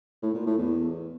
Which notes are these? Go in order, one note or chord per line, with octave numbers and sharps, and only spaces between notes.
A2
A#2
A2
E2